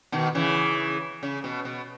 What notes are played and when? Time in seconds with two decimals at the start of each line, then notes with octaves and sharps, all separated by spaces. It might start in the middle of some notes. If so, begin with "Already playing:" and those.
0.12 B2 D#3
0.35 C#3 E3
1.23 C#3
1.44 B2
1.65 B2